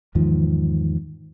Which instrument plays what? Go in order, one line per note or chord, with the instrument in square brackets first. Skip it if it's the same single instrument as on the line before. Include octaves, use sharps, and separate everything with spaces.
[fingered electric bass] E2 G#2 D#3 F3